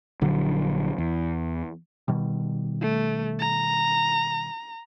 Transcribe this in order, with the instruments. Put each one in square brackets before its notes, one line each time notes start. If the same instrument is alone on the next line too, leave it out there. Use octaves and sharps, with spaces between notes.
[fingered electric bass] A#1 D3 F#3
E2
[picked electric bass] B2 D#3 G3
[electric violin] A3
A#5